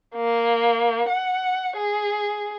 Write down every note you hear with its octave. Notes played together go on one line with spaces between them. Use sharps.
A#3
F#5
G#4